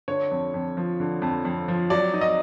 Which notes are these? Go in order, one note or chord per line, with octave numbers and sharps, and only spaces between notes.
D3 C#5
F2
F2
F3
D3
F2
F2
F3
F#3 D5
D#4
D#5